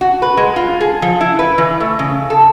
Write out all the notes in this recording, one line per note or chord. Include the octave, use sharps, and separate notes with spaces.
F#4
B4
G#3
F4
G#4
F3
E4
B4
E3
A3
C#3
A4